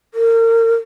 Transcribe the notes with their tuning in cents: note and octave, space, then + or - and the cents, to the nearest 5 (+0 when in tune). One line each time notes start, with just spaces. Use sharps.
A#4 -30